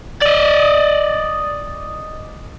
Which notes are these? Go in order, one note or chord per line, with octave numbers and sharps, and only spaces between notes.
D5 D#5